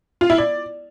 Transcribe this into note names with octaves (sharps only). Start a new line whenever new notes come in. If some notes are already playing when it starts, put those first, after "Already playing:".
F4
E4
D5